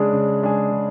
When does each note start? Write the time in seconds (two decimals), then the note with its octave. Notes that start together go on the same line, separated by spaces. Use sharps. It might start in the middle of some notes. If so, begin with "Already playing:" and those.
Already playing: C#3 G#3 D4 G#4
0.13 C#3
0.42 G#3 D4 G#4
0.71 C#3